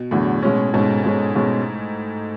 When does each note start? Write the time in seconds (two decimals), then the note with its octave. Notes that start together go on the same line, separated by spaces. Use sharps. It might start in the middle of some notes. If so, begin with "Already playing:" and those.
Already playing: B2
0.11 E2 A2 D3 F#3
0.43 B2 G#3 C#4
0.73 G#2 B2 G#3 C#4
1.04 B2 G#3 C#4
1.35 B2 G#3 C#4